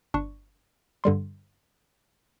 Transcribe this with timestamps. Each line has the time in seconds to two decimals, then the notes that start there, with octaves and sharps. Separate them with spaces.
0.14 G1 D4 C#6
1.04 G2 D3 G3 C6